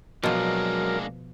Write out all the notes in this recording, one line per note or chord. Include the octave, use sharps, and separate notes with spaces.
B2 F3 F#3 G#3 A#3 D4 A#4